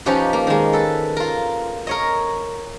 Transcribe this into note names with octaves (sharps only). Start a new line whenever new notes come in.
F3 C#4 D#4 G4 B4
A#3
D#3 G#3
A4 B4
F4 A#4
A#4 C#5 D#5